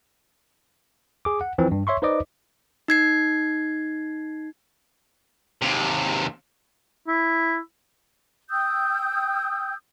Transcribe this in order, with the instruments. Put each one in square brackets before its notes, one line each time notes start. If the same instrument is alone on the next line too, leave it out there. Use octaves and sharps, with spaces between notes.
[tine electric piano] G#4 D6
F#5
E3 F3 C4
G2
C#5 E5 C6 C#6
D#4 B4 C5 D5 D#5 D6
[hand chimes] D#4 G#6 C7
[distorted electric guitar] D#2 C3
[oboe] E4
[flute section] G5 D#6 E6 G6